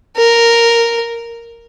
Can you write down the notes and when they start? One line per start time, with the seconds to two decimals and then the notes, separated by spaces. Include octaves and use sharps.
0.17 A#4